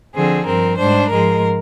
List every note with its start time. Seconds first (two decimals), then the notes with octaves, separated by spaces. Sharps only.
0.15 D3 F3 C4 G#4
0.47 G2 F3 C4 A#4
0.78 G#2 G3 D4 C5
1.10 G#2 F3 G#3 A#4